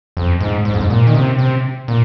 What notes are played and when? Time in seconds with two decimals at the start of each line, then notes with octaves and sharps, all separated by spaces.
0.17 F2
0.40 G#2
0.65 G#2
0.74 F2
0.80 G#2
0.90 A#2
1.07 D#3
1.14 C3
1.38 C3
1.88 A#2